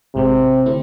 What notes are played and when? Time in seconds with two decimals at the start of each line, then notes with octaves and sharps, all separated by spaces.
0.15 A1 G#2 C3 G#3
0.66 D3 A3 C4 E4